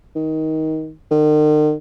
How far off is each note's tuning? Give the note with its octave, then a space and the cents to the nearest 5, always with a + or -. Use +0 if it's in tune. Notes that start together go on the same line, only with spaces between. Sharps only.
D#3 +20
D#3 -45